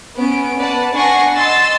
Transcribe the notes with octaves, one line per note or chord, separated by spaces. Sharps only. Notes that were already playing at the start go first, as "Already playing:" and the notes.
B3 C#4 D7
B4 D5 F#5 A5
D4 F#5 G#5 C#6 A#6 C7
D#5 C6 E6 A6